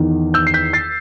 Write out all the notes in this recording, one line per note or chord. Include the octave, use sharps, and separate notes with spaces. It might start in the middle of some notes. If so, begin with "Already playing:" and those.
Already playing: E2 D#3
E6 G6
C7
G6 B6
A6 C7